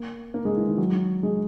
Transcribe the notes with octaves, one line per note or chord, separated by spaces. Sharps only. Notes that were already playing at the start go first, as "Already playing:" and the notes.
Already playing: A#3
A#3
G#3
E3
D#3
F#3
G#3